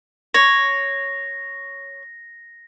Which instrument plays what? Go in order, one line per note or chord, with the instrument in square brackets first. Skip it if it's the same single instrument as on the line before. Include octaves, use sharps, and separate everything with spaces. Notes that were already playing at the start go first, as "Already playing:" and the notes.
[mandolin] C#5 [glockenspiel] A#6